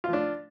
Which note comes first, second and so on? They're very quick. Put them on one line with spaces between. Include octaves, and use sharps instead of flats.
F4 F3 D4